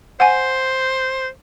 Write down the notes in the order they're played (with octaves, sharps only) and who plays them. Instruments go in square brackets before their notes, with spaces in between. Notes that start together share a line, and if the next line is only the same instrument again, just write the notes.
[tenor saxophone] C5 [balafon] F#5 G#5